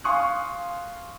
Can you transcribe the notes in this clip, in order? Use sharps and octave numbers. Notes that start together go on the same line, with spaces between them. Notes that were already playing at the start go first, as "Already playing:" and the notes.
F5 G#5 C6 C#6 D#6 F#6